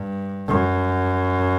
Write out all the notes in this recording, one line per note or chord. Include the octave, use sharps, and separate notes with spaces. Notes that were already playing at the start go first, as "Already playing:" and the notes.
Already playing: G2
F#2